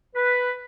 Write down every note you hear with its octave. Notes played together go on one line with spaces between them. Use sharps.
B4